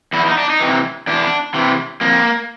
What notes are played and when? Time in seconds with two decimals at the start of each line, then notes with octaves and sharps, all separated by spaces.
0.13 E2 E4
0.25 D#4
0.38 D4
0.50 D#4
0.60 C3 E3
1.07 E2 D4
1.54 C3 E3
2.01 F2 A#3